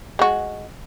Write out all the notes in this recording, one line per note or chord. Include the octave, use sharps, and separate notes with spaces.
G#3 F#4